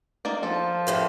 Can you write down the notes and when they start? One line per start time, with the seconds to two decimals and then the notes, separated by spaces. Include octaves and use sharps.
0.25 A#3 D#4 D5
0.43 F3 A4
0.87 F2 A2 E3